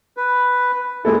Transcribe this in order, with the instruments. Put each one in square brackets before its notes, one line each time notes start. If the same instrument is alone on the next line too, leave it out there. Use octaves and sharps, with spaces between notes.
[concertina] B4
[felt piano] G#3 A#3 A4 [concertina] E4